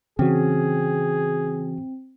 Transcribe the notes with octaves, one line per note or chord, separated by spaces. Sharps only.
C#3 E3 C4 F#4 G#4